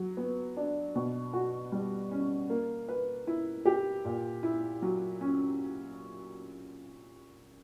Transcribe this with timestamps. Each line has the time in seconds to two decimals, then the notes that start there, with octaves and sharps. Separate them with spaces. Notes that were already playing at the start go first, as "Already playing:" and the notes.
Already playing: F#3
0.17 B3
0.57 D4
0.96 B2
1.33 F#4
1.72 G3
2.11 C#4
2.50 A#3
2.88 B4
3.27 E4
3.66 G4
4.05 A#2
4.43 E4
4.82 F#3
5.21 C#4